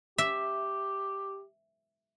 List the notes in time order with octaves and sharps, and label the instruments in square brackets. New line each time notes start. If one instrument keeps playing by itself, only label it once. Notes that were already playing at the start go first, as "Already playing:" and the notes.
[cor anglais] G4 [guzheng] E5